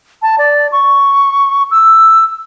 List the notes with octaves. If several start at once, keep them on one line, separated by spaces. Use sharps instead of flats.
A5
D5
C#6
E6